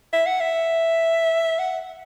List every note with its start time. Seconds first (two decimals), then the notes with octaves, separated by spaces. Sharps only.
0.13 E5
0.26 F#5
0.40 E5
1.59 F#5